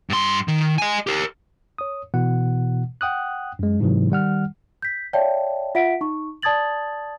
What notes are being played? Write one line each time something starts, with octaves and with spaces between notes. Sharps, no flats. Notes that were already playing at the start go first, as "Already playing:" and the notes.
G2 C6
D#3
D#5 G#5
G4 A#4
C#5 D#6
B2 E3 F#5
F#5 G5 D#6 F#6
F#2 G#3
G#2 C3 E3 F#3
D#3 G3 F#5 F6
G6 B6
C#5 D5 E5 F5 G5 A5
F4 E5 F#5 B6 D7
D#4 C#6
D5 A5 D#6 G#6 A6 F#7